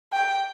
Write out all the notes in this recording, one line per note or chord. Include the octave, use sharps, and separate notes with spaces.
G5